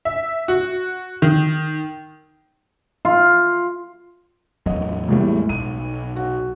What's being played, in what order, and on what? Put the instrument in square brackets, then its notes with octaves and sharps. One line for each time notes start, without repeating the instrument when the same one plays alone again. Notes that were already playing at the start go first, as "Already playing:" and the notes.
[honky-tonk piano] E5
F#4
D#3
[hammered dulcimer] F4
[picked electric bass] E2 A2 F#3 [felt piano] D#5
[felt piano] E2 A2 G3 [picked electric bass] G#3 A#3
[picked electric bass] B1 [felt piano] D#7
[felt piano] F#4